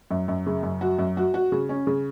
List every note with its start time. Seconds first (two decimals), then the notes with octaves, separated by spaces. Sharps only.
0.11 F#2
0.28 F#2
0.46 C#3
0.63 F#2
0.81 F#4
0.99 F#2
1.17 F#4
1.34 F#4
1.52 C#3
1.69 C#4
1.87 C#3